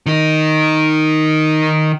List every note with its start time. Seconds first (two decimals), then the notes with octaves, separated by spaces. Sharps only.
0.06 D#3 D#4